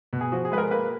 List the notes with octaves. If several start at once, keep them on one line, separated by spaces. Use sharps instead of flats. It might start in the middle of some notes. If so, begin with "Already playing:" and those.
B2
G#4
F3 F#4
G#4
G#3 B4
A#4
A#3 B4